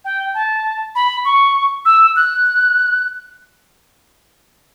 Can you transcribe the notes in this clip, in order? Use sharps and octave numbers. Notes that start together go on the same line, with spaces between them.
G5
A5
B5
C#6
E6
F#6